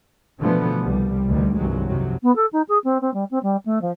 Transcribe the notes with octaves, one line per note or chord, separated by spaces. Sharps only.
B2 D3 E3 F3 A3 B3
C2 G3
D2 B2 D3 D#3 G3
C2 G2 C3 D#3 F#3 G#3
F2 C3 F#3
B3
A4
D#4
G#4
C4
C4
G3
C4
G3
A3
F3